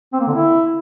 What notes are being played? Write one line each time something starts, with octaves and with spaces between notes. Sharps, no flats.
C4
A#3
D3
E4